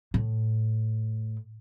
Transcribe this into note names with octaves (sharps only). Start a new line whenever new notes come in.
A2